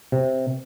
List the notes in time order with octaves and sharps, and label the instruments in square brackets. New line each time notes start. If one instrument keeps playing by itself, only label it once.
[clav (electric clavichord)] C3